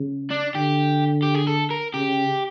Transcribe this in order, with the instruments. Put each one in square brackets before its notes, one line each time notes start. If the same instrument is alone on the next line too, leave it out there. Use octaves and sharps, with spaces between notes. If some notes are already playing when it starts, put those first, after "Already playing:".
Already playing: [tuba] C#3
[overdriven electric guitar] D4
[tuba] D3 [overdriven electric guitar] G4
[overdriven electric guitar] G4
G#4
A4
A#4
[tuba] C#3 [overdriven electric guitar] G4